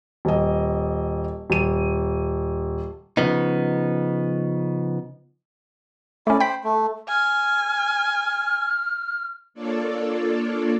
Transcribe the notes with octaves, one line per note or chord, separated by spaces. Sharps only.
D#1 D#5
D#1 D#7
C#3 F3 B3 D#4
A3 C#4 E4 D5
C5 G5 B5 B6
A3
G#5 F6
A#3 D4 F4 A4 C#5 D5